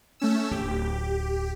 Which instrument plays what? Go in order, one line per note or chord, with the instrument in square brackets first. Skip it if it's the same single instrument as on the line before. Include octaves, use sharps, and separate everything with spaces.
[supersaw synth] A3 C#4 E6
[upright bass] D1 [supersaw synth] G4